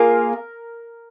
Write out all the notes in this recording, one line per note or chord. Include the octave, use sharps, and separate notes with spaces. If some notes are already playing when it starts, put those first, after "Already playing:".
Already playing: A#3 F4 G#4 A#4